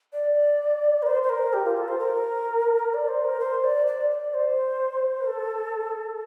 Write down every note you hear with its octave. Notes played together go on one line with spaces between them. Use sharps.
D5
A#4
C5
C5
A#4
G4
F4
A4
C5
A#4
D5
C5
A#4
C5
D5
D5
D5
C5
A4